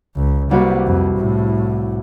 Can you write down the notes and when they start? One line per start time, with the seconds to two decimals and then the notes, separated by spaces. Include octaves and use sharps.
0.16 C#2
0.51 C2 G3 A#3 F#4 B4
0.87 F2
1.18 A2